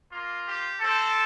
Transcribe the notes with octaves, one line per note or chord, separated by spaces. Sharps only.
A#3 F4
G4
C4 G4 A4